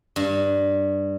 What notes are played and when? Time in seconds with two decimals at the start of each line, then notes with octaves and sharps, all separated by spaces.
0.16 G2